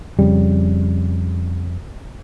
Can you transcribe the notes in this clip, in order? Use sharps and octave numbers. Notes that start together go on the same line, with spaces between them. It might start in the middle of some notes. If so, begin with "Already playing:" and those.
F2 C#3 G3